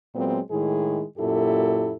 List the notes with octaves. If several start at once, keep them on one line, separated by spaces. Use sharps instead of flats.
A#2 F#3 G#3 B3 C4
A2 D#3 G#3 E4 G#4
F#2 A#2 E4 G4 A4